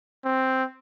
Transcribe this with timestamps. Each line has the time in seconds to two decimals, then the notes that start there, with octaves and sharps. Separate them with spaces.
0.25 C4